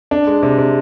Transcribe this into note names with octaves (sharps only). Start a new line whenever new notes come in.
D4
G#3
C3
C3